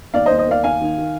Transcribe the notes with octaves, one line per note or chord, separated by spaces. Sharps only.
D#2 D5 F5
C5 D#5
D#2
C5 D#5
A#3 D5 F5
D#2 F5 G#5
D#3
D#3